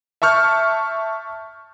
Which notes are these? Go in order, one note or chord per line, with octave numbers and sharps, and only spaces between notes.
E5 A5 C#6 F6 G6